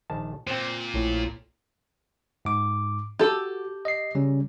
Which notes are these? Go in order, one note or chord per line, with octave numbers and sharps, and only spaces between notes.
A#1 D#3 A5
A#2 C4 C5
A#1 A2
G#2 D6
F#4 G4 A4
D#5 C7
C#3 G3 C#4